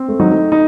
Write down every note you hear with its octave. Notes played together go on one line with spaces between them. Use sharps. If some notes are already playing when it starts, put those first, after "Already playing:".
Already playing: C4
A3
F#3 D#4
A3
D#4